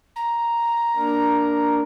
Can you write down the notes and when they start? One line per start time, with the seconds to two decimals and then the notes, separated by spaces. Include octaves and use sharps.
0.16 A#5
0.96 A#3 D4 A#4